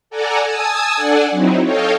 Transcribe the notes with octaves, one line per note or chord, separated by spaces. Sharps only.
A4 D5 F#5 G#5 A#5
G#5 A5 D#6 E6 G#6
D4 A4 D5 F#5 G#5
F#3 C4 D#4 E4
A4 C#5 D#5 F5 G5